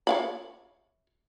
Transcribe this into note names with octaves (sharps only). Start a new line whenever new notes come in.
C#5 F5 B5